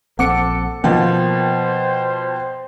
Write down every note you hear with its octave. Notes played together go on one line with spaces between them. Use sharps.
A#1 C4 A4 F#5 D6 C#7
B2 F3 A#3 C5 G5